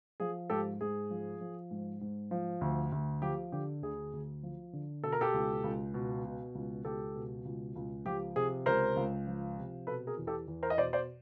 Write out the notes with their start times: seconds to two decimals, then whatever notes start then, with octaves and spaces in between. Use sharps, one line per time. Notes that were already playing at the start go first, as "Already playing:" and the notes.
0.20 F3 G#4
0.50 G#2 G4 A4
0.80 G#2 G#4
1.10 F3
1.41 F3
1.71 G#2
2.01 G#2
2.31 F3
2.61 D2
2.92 D2
3.22 F3 G4
3.52 D3 G4
3.82 D2 G#4
4.13 D2
4.43 F3
4.73 D3
5.03 B2 A4
5.12 A#4
5.21 G4 A4
5.34 C#2
5.64 C#2
5.94 B2
6.24 B2
6.55 C#2
6.85 C#2 G4 A4
7.15 B2
7.45 C#2
7.76 C#2
8.05 F3 G4
8.36 C3 G#4
8.66 C#2 A#4 C5
8.96 C#2
9.27 F3
9.57 C3
9.87 B2 A4 B4
10.07 G#4 A#4
10.17 E2
10.27 G4 A4
10.48 E2
10.63 A#4 C5
10.70 D#5
10.78 B2 C5 D5
10.93 C5 D5